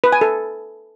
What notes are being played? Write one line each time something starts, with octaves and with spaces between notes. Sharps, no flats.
B4
G#5
A4